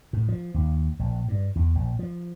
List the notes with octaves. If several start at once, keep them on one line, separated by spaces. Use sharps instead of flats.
A2
F3
D#2
A#1
G2
E2
A#1
F3